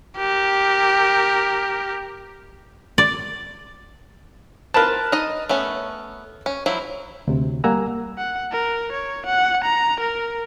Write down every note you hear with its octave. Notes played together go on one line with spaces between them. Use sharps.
G4 A#4
D5
C4 F4 A#4 B4 A5
D#4 D#5
A3 B3 C#4
C#4
F3 F#3 E4
D2 C3
G3 A#3 F#5 G#5 A#5 E6
F#5
A#4
C#5
F#5
A#5
A#4